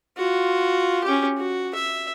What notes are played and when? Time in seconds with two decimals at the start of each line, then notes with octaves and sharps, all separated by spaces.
0.17 F4 F#4
1.04 C#4 G4
1.37 F#4
1.75 E5